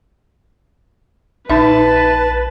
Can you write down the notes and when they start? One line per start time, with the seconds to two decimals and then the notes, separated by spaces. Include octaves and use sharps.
1.50 A#1 D#4 B4 E5 A5